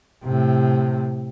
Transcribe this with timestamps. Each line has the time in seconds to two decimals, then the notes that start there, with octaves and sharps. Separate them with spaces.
0.24 A2 C3